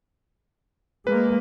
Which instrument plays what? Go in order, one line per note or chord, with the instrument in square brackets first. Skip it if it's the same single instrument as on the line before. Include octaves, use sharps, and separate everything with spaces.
[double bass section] G#3 A#3 [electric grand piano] B4